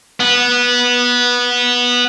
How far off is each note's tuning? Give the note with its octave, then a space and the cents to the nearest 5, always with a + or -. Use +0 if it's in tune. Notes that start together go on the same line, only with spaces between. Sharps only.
B3 -15